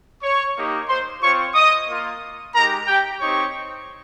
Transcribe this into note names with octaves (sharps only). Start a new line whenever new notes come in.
C#5 C#6
A#3 D#4 G4
C5 C6
C4 F4 C#5 C#6
D#5 D#6
A#3 F4
G#3 D#4 G4 A#4 A#5
G4 G5
C4 D#4 G4 C#5 C#6